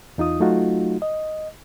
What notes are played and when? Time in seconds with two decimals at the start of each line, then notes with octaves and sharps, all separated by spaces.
0.18 E2 D#4 F4 D#6
0.40 F#3 A3 D#4 F4 F#4
1.02 D#5